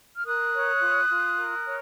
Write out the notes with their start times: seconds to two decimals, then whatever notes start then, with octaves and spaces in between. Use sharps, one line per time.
0.16 F6
0.26 A#4 D#6 F#6
0.55 C#5
0.81 F4
1.10 F4
1.38 A#4
1.65 C#5